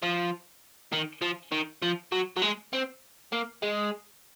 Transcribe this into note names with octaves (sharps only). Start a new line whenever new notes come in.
F3
D#3
F3
D#3
F3
F#3
F#3
G#3
C4
A#3
G#3